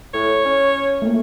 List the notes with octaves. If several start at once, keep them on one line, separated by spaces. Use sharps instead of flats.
A2 C#5
C#4
A3 A#3